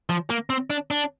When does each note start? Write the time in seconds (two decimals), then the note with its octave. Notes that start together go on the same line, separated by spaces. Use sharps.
0.10 F3
0.30 A#3
0.50 C4
0.70 D4
0.91 D4